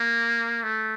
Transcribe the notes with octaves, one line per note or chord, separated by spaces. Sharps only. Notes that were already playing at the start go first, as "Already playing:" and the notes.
Already playing: A#3
A3